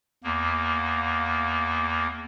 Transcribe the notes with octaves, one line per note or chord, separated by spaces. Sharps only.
E2 A#3